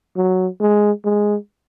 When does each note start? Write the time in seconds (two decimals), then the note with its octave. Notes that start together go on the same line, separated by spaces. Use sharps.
0.16 F#3
0.61 G#3
1.05 G#3